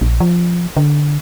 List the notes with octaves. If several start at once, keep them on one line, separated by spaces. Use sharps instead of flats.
A#1
F3
D3